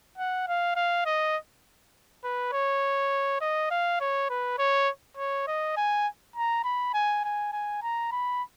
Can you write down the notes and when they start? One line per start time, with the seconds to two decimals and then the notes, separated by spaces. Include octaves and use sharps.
0.18 F#5
0.48 F5
0.76 F5
1.06 D#5
2.24 B4
2.53 C#5
3.41 D#5
3.71 F5
4.01 C#5
4.30 B4
4.59 C#5
5.17 C#5
5.47 D#5
5.77 G#5
6.36 A#5
6.64 B5
6.94 G#5
7.24 G#5
7.53 G#5
7.82 A#5
8.12 B5